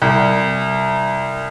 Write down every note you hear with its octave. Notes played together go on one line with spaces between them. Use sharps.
C2